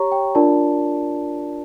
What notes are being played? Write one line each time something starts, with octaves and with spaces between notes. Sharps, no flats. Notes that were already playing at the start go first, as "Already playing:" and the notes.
Already playing: G4 C#5 A#5 C#6
G5
D4 F4 A#4 D5 A5